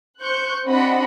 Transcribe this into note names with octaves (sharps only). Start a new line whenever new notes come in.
C5 C#6 F#6 G6
C4 D4 F#4 D#5 F#5 B5